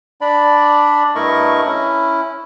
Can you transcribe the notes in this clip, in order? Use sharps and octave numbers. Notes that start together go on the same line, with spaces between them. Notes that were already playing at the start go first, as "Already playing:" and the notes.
D4 D5 B5
G2 A3 E4 A#4 D#5 C#6
C#4 E4